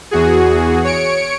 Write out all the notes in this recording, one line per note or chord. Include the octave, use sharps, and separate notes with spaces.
E2 F#4 G#4
C#5 C#7 D7